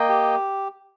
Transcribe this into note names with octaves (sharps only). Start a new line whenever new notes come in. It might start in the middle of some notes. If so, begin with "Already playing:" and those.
Already playing: A#3 D#5 G5
G4